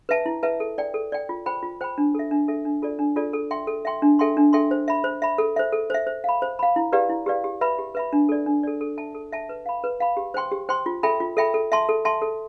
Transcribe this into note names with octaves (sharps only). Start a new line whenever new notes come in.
B4 E5 A5
E4
B4 E5 A5
A4
D5 G5
A4
D5 G5
F4
C5 G5 B5
F4
C5 G5 B5
D4
A4 E5
D4
A4 E5
D4
F4 A4 D5
D4
F4 A4 D5
A4
E5 G5 C6
A4
E5 G5 C6
D4
A4 E5 G5 C6
D4
A4 E5 G5 C6
C5
E5 B5
C5
E5 B5
A4
C5 E5
A4
C5 E5
C5
F5 B5
C5
F5 B5
E4
G4 B4 D5 F5
E4
G4 B4 D5 F5
G4
B4 E5 B5
G4
B4 E5 B5
D4
A4 D5
D4
A4 D5
A4
E5 A5
A4
E5 A5
B4
F5 B5
B4
F5 B5
G4
C5 G5 C6
G4
C5 G5 C6
F4
A4 E5 G5 B5
F4
A4 E5 G5 B5
A4
E5 A5 C6
A4
E5 A5 C6
A4